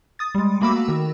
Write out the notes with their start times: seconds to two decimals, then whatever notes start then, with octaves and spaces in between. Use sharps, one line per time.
0.19 D#6 A6
0.35 G3 G#3
0.61 A3 A#3 F#4 B5 D6 E6
0.88 D#3 F#4